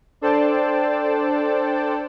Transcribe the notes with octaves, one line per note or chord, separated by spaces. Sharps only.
D4 A4 C5 D5 G5 A5